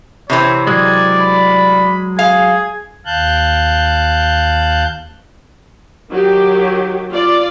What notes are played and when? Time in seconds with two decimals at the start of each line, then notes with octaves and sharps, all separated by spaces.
0.30 C3 E3 C4 C#5
0.67 F#3 G#3 D5 G#6
1.21 B5
2.19 G#4 F5 G#6
3.06 D#2 F5 A5 F#6 G6
6.10 D#3 F#3 G4
7.12 F4 D5